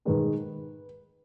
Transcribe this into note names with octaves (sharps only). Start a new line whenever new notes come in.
G#2 D#3 G#3 B4